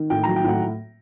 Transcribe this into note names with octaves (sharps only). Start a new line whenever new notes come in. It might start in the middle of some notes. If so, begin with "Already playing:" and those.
Already playing: D#3
A2 G5
F#3 A#5
G5
A2 F#5